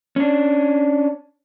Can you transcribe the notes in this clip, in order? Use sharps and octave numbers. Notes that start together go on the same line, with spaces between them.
C#4 D4